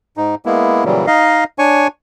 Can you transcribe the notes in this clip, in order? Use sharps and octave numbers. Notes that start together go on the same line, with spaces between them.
G#2 D#4
G#3 A#3 B3 E4
A#2 C#3 E3 F#3 G3
D#4 D#5 F5
D4 C#5 G#5 C#6